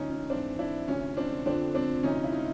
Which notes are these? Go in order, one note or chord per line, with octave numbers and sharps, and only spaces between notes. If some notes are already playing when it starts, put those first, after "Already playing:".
Already playing: D2 D3 F3 C#4 D#4
C#4
G#2 E3 C4 D4
D4 E4
D2 C3 F3 C#4
C4 D4
F2 D3 F3 C4 D4
C4 D4
D2 C3 F3 C#4 D#4
E4
D#4 F4